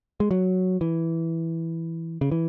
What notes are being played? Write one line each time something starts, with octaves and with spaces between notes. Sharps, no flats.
G#3
F#3
E3
C#3
E3